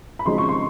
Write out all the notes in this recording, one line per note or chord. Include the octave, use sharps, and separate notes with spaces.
B5
C#3 F3 G#3 C4 D#4 C6
C#6
C6